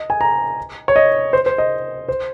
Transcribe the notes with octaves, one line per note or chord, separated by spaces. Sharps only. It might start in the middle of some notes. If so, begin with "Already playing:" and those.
Already playing: D#5
G#5
A#5
C#5
D#5
C5
C5
D#5
C5